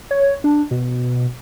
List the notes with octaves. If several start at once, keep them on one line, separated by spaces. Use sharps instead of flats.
C#5
D4
B2